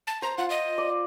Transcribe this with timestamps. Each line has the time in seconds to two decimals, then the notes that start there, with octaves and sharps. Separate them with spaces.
0.07 A5
0.22 C5 A#5
0.38 F4 F#5
0.50 D#5
0.78 D5